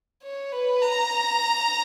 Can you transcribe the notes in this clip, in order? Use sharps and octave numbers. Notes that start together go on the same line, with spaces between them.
C#5
B4
A#5